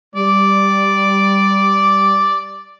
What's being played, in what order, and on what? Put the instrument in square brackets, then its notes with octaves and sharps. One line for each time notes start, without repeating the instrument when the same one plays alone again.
[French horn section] G3 [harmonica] D5